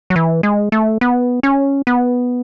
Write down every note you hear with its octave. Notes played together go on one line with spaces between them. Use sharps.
F#3
E3
G#3
A3
B3
C#4
B3